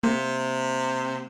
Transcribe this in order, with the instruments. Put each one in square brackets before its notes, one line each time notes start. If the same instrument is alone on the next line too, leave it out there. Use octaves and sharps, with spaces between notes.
[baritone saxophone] C3 [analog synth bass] A#3